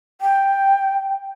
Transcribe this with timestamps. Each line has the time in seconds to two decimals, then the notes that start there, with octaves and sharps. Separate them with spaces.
0.21 G5